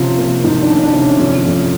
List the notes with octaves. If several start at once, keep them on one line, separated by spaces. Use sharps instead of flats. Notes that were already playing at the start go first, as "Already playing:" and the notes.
Already playing: C3 F3 C#4 F4
A#3
D#3 F3 D#4
D4
C#4
D4
C3
C#4
F2 C#4
F2